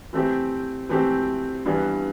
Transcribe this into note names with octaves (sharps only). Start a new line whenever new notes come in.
E3 A3 C4 G4
E3 A3 C4 G4
G2 E3 G3 B3